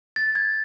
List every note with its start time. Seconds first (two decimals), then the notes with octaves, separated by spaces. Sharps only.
0.16 A6
0.35 G#6